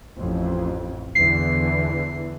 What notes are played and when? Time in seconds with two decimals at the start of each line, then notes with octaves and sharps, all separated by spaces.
0.18 A1 F2
1.15 E2 D3 E3 C7